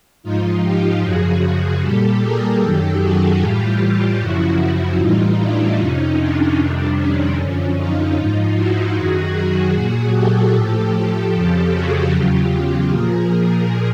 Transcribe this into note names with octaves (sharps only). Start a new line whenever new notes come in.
G#2 F3 D#4 F4
F4 G4
F#2 C#3 F3 F#4 G#4
A#2 G3 G4 A4
G#4 A#4
F#2 D#3 F#3 G4 A4
F#4 G#4
A2 E3 G3 F4 G4
F#2 C#3 F3 E4 F#4
A2 E3 G3 D#4 F4
D4 E4
F2 C3 F3 C#4 D#4
D4
F2 C3 D#3 G3
C#4
F#2 D3 F3
D#4 F4
G#2 F3
E4 F#4
F#2 D#3 F#3 F#4 G#4
F#4 G#4
A#2 F#3
G4 A4
A2 F3
G4 A4
F2 C#3 F3 G4 A4
F#4 G#4
E2 C#3 F#3 F4 G4
A#2 F3 G#4 A#4